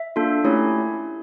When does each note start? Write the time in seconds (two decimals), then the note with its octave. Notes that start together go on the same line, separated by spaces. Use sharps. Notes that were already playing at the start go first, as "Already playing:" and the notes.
Already playing: E5
0.16 A#3 D4 F4 A4
0.44 A3 C#4 E4 G4 C#5